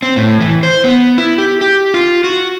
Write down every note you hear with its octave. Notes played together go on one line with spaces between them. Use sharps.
C4
A2
E3
C5
B3
E4
G4
G4
F4
F#4